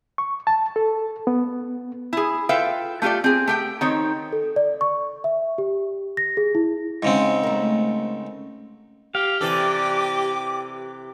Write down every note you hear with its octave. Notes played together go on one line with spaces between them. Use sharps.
C#6
A5
A4
B3
E4 G#4
F4 A4 B4 E5 F5 G5
A3 F4 G4 A4 D5
C4 G#4
A3 G4 G5
D#3 C4 D#4 C#5
A4
D5
C#6
E5
G4
A#6
G#4
E4
G#2 C#3 C4
A3 A#4
G4 F5
C3 E3 A4 D5 G5 D6